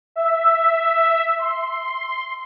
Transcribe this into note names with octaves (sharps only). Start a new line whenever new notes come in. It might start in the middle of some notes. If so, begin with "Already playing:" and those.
E5
C6